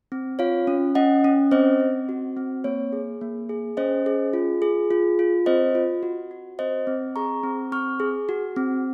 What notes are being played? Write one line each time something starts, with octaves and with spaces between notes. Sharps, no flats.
C4
F4 C#5 F5
C#4
C#4 D#5 F#5
C#4
C4 C5 D#5
C4
F#4
C4
A#3 C#5
G#4
A#3
G#4
C#4 C5 D#5
G#4
F4
G#4
F4
F4
C4 C5 D#5
F4
F#4
F#4
C4 C5 D#5
C4
G#4 A#5 C#6
C4
C4 C#6 F6
G#4
F#4
C4